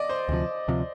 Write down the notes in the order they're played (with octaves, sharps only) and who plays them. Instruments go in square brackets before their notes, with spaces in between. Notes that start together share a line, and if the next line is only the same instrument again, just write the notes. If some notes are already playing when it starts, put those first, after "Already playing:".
Already playing: [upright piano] D5 D#5 D6
C5
[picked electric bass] D2 C3 F3
D2 C3 F3